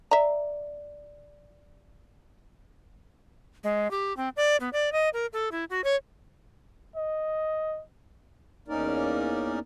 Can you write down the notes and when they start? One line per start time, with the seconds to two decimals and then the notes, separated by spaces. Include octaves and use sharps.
0.11 D5 E5 A#5
3.64 G#3
3.91 G4
4.17 C4
4.37 D5
4.60 B3
4.73 D5
4.92 D#5
5.13 A#4
5.33 A4
5.52 E4
5.70 F#4
5.84 C#5
6.96 D#5
8.68 E2 A#3 C#4 D#4 A#4 D5